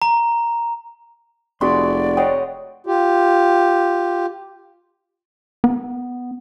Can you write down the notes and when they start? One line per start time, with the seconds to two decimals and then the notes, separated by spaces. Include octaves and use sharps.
0.02 A#5
1.61 F1 G#3 F#4 D5 B5 C6
2.17 C#5 D#5 F#5 G5
2.86 F4 G4
5.64 B3